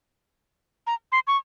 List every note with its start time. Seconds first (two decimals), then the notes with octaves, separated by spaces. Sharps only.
0.87 A#5
1.12 C6
1.27 C#6